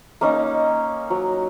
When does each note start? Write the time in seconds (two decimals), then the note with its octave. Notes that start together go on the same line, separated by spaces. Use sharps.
0.21 A#3 C#4 D#4
1.10 F#3